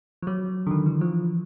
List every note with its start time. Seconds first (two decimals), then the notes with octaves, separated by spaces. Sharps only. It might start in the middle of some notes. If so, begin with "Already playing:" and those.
0.22 F3
0.27 F#3
0.67 D3
0.71 D#3
0.86 E3
1.01 F3